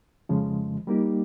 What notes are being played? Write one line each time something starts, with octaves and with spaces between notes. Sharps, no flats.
F2 C#3 F3 G#3
G3 A#3 D#4 G4